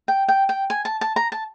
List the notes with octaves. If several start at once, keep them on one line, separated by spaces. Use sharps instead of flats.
G5
G5
G5
G#5
A5
A5
A#5
A5